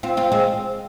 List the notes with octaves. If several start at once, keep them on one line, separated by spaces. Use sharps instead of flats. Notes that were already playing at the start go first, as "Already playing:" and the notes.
C4 F4
C4 F4
G#3 C4